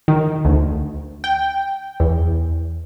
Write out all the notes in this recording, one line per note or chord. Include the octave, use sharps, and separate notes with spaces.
D#3
D2
G5
E2